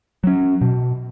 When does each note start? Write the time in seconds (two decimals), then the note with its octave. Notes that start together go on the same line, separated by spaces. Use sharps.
0.24 F#3 C#4
0.61 B2